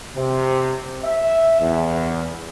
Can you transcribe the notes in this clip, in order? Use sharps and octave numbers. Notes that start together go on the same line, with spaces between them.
C3
E5
E2